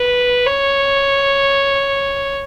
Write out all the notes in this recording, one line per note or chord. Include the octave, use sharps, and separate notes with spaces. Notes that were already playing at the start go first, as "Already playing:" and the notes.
Already playing: B4
C#5